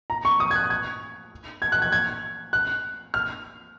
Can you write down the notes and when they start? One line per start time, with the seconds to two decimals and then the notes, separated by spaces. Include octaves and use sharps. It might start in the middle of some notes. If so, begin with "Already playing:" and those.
0.10 A#5
0.25 C#6
0.40 D#6
0.51 G#6
0.56 F#6
0.70 G#6
1.62 G#6
1.72 F#6
1.82 G#6
1.92 G#6
2.53 F#6
3.14 F6